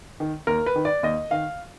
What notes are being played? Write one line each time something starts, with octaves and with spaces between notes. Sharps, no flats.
D#3
D#2 A#4
B4
D#3
D5
D#2 D#5
D#3 F5